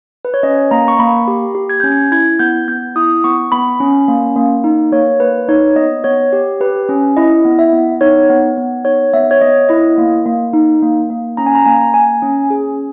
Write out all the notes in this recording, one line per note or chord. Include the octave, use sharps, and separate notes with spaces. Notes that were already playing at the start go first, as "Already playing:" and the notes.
B4
C#5
C#4 D#5
A#3 A#5
C#6
A#3 B5
G4
G4
G#6
C#4 G6
G#6
E4 G#6
B3 G6
B3 G6
E4 D#6
B3 C#6
B3 B5
C#4
A#3
A#3
D#4
A#3 C#5
A#3 B4
D#4 C#5
B3 D#5
B3 C#5
G4
G4 B4
C#4
E4 D#5
B3
E5
B3
D#4 C#5
B3
B3
D#4 C#5
B3 E5
C#5
B3 D#5
E4 D#5
A#3
A#3
D#4
A#3
A#3
C#4 A#5
G#5
A#5
A#3 G#5
A#3 G#5
C#4
G#4